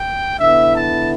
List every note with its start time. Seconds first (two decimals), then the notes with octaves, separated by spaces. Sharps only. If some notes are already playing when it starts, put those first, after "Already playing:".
Already playing: G5
0.40 D3 B3 E4 E5
0.75 A5